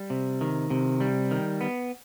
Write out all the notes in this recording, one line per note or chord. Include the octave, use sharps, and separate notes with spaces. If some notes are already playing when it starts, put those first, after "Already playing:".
Already playing: G3
C3
D#3
C3
G3
D#3
B3